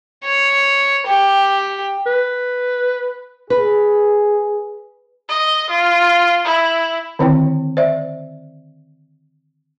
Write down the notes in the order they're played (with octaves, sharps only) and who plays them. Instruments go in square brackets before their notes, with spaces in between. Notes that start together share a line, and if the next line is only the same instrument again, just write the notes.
[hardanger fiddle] C#5
G4
[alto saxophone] B4
[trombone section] G#4 [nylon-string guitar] B4
[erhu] D#5
F4
E4
[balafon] D3 D#3 C4 E4 C#5 G5
C5 D5 E5